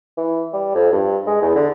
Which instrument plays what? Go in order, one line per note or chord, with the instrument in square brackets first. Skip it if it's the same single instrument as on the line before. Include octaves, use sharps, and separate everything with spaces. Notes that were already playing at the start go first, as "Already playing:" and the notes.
[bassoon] E3
G3
F2
G2
G#3
E2
D3